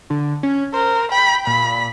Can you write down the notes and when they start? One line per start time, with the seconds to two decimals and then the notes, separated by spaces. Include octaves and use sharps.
0.10 D3
0.43 C#4
0.74 A#4 C5
1.12 G5 B5
1.47 A#2 B5